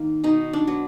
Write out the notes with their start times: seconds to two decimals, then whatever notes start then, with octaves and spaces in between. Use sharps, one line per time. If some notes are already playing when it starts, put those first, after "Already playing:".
Already playing: D#3 A#3
0.24 B2 D#4
0.53 D4
0.67 F#3 B3